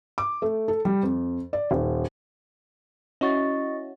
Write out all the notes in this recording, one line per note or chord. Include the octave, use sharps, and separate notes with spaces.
D6
A3
A4
G3
F2
D5
D#1
C#4 E4 F#4 D#5 C#6 A6